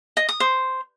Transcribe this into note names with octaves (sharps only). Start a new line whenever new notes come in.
D#5
D#6
C5